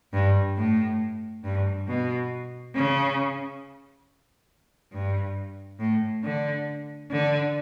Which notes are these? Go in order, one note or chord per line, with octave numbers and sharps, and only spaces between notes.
G2
A2
G2
B2
C#3
G2
A2
D3
D3